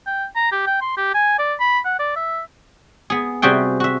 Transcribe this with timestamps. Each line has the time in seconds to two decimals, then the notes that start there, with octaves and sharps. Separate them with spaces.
0.07 G5
0.36 A#5
0.52 G4
0.67 G5
0.82 C6
0.97 G4
1.14 G#5
1.39 D5
1.60 B5
1.85 F#5
2.00 D5
2.16 E5
3.10 B3 G#4
3.42 C3 G3 F#4 G#4 G5
3.80 F#4 E5